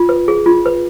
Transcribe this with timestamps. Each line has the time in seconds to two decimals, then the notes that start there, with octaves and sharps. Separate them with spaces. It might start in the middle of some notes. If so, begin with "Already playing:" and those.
Already playing: F4
0.09 B4
0.28 G#4
0.46 F4
0.66 B4